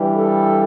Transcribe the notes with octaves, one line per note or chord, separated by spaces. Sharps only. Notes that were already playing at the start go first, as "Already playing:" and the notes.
Already playing: G2 E3 G3
A4